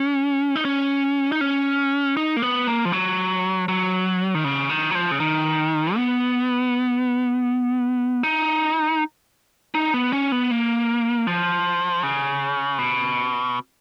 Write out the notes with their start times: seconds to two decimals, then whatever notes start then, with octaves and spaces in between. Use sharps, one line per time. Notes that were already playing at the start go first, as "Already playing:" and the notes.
Already playing: C#4
0.56 D#4
0.65 C#4
1.32 D#4
1.41 C#4
2.17 D#4
2.37 A#3
2.42 B3
2.67 A#3
2.85 F3
2.92 F#3
3.68 F#3
4.35 D#3
4.44 C#3
4.69 D#3
4.91 F#3
4.95 F3
5.11 C#3
5.20 D#3
5.96 B3
8.23 D#4
9.75 D#4
9.94 B3
10.13 C#4
10.32 B3
10.51 A#3
11.27 F3
12.03 C#3
12.79 B2